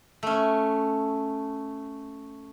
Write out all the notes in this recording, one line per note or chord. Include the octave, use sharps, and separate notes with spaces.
A3 C#4